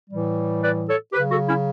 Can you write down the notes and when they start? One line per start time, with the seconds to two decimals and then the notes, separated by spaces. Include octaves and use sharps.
0.10 A2 E3 G3
0.62 B4 D5
0.87 A4 C#5
1.13 C#3 F#3 G4 B4
1.31 F#4 A4
1.47 C#4 E4